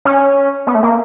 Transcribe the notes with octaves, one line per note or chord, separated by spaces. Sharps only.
C#4
B3
A3
A#3